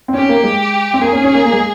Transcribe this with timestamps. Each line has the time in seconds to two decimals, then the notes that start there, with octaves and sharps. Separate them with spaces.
0.08 C4
0.14 C#4 G4
0.29 A#3
0.44 G#3
0.94 C4
1.01 A#3 G#4
1.12 C#4
1.24 C#4
1.34 A#3
1.46 A#3
1.52 G#3